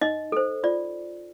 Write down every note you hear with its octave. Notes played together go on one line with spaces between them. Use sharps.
D#4 D#5
A4 C5
F4 D5